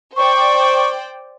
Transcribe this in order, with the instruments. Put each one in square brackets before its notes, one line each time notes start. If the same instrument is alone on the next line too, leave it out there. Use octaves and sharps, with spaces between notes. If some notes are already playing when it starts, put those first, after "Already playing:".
[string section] C5 D5 G5 [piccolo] C#6